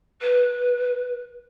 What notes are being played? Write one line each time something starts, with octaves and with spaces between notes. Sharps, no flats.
B4